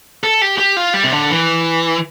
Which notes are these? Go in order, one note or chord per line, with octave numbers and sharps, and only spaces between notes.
A4
G4
G4
F4
G3
C3
D3
E3